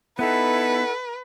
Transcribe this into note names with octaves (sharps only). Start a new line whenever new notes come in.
B3 D#4 E4 A4 B4 F#5